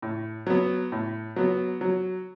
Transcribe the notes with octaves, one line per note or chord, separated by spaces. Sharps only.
A2
F#3 B3
A2
F#3 B3
F#3